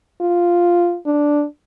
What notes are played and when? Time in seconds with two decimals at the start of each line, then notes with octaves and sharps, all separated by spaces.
0.21 F4
1.06 D4